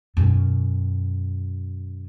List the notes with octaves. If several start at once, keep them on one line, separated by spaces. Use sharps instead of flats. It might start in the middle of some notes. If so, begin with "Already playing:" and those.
F#2 B2